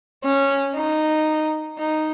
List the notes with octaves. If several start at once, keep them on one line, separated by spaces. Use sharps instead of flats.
C#4
D#4
D#4